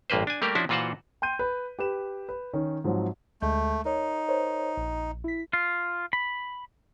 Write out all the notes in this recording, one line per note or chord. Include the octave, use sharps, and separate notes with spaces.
A1 G2 A#3 B4 C5
D4 G#5
G3 A3 A#3 G4 A#4
F3 C#4 D4 E4 F#4
A#2 E3 F4 F#4 C5 F#5
G5 C6 G6 D#7
B4
G4 B4 E7
B4
D#3 C#4
G#2 F3 F#3 C4
D2 G#3 A3 G6
D#4 A#4 C#5
A#4 C5 C#5
A#1
E4 B6
F4
B5